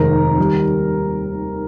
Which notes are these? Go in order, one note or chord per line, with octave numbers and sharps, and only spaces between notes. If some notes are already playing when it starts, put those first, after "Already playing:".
Already playing: F1 D#2 D#3 G#3 A#4 A#5
D#2 D#3 G3